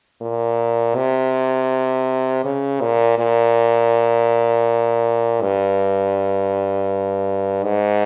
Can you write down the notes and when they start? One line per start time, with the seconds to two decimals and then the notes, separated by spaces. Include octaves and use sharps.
0.21 A#2
0.96 C3
2.44 C#3
2.81 A#2
3.18 A#2
5.41 G2
7.64 G#2